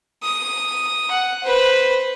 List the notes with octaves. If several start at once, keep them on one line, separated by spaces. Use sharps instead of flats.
D#6
F#5
B4 C5